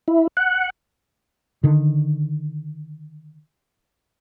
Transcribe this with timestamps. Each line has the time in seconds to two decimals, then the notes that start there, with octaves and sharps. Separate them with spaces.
0.08 E4
0.37 F#5
1.64 D3 D#3